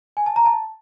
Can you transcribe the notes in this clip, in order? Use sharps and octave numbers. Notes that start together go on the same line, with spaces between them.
G#5
A5
A#5
A5